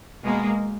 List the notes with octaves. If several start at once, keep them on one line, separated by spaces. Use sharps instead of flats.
B2 G#3 A#3